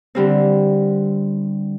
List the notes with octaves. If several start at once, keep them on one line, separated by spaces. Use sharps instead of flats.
D3 G3 C4